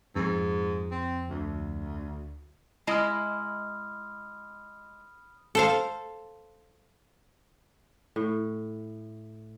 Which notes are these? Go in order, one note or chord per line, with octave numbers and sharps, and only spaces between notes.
F2 G#2
C4
D2
G#3 E4 D#5 B5 D#6 F6
A4 C5 F5
A2